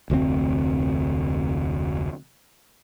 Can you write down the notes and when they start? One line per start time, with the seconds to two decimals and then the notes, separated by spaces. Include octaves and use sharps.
0.10 F1 D2 A#2 C4